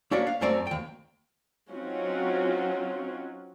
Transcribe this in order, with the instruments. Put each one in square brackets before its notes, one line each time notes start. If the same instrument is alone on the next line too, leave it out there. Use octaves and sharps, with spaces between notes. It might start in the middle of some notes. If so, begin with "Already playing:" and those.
[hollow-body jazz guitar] A#3 D4 F#4 C#5 D5 E5
F5
F#2 F#3 A3 C4 D5 A#5
D#2 G5
[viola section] F#3 C4 C#4 D#4 F4 F#4